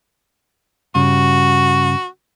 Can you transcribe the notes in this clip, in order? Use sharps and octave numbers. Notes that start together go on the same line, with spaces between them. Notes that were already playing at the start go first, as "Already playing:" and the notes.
G2 C#3 F#4